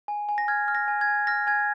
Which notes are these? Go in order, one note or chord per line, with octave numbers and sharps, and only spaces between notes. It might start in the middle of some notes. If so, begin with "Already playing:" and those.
G#5
G#5
A#6
F6 G#6
F6
A#6
G#5
G#6
G#5
F6 A#6
G#5 G#6